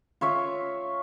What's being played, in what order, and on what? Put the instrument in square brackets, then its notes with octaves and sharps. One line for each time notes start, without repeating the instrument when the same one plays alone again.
[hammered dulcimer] F4 C#5 E5